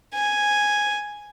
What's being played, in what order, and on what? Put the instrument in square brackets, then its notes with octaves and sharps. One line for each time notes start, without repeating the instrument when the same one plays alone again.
[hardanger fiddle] G#5